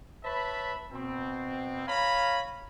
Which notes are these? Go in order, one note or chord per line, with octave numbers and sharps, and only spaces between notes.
B4 C#5 E5 A5 B5
B2 C4
C#5 F5 G#5 A#5 B5